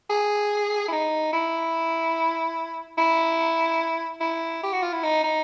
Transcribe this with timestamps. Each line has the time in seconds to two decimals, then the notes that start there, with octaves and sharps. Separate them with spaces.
0.10 G#4
0.88 E4
0.92 D#4
1.33 E4
2.98 E4
4.21 E4
4.63 G4
4.73 F#4
4.83 F4
4.93 E4
5.03 D#4
5.24 D#4